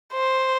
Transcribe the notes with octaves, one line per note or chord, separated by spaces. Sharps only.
C5